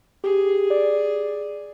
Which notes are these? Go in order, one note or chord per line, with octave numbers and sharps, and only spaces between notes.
G4 G#4
D5